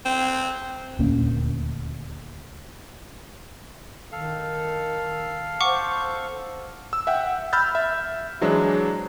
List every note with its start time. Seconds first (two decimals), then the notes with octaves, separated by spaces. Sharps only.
0.06 C4
0.99 D#1 D2 A#3 C#4
4.12 D#3 A4 F5
5.61 C5 F#5 C#6 D6
6.93 E6
7.07 E5 F#5 G5
7.53 B5 E6 F6 G6 A6
7.75 E5
8.41 E3 F#3 G#3 D4 C5